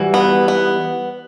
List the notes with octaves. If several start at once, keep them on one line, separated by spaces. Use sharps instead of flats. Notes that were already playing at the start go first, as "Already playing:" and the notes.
Already playing: E3 G3 F#4
B3
B3